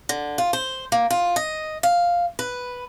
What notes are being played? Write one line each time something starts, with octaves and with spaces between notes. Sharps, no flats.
D3
F4
C5
A#3
F4
D#5
F5
B4